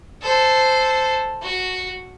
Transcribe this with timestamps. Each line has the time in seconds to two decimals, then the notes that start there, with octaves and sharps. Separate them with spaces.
0.22 A4 C5
1.42 F#4